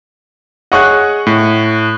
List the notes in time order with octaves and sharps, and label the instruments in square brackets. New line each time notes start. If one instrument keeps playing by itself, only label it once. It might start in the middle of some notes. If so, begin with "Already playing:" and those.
[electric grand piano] G#4 C#5 D#5 [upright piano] F#5 C#6 F#6
[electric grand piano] A2